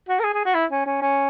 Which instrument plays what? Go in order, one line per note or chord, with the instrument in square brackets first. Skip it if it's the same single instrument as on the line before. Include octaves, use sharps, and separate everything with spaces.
[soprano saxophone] F#4
A#4
G#4
G#4
F#4
E4
C#4
C#4
C#4